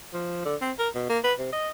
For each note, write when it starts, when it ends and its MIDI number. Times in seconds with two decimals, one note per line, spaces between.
0.13 0.44 53
0.45 0.55 50
0.61 0.72 60
0.78 0.89 70
0.95 1.06 47
1.09 1.19 58
1.24 1.33 71
1.39 1.51 48
1.53 1.70 75